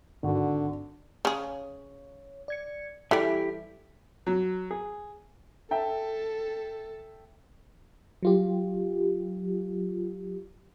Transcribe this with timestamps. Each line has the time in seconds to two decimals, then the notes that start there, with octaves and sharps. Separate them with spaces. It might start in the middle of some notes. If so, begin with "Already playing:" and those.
0.23 G#1 D3 F#4
1.25 C#3 G#4 C#5
2.48 D5 G#6 C#7
3.11 E3 G3 E4 G4 A4 E5 G5
4.27 F#3
4.71 G#4
5.71 A4 E5 G5 A5
8.23 F#3 F4 G4